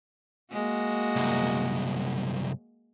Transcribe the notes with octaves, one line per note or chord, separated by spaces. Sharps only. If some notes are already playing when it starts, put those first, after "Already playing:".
G#3 A#3 F#4
C2 F#2